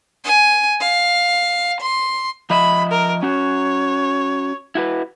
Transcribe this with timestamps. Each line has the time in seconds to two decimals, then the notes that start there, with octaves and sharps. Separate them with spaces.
0.24 G#5
0.80 F5
1.81 C6
2.50 F3 D#5 E5 B5
2.91 A#4
3.23 C#4 F#4 C#5
4.75 E4 F#4 B4